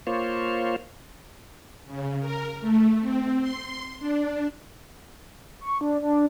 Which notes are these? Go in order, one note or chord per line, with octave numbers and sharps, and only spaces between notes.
A#3 F4 C5 C#5
C#3
A#4
A3
C4
C6
D4
C#6
D4
D4